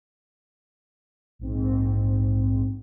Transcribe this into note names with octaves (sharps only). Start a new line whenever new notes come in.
A#1 G#2 C4